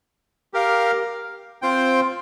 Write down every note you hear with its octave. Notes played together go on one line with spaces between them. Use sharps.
G4 A#4 F5
C4 F4 C5 G5